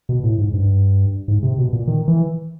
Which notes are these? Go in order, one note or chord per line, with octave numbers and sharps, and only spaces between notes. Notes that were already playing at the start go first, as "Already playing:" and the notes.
B2
A2
G#2
G2
G#2
C3
B2
A#2
D#3
E3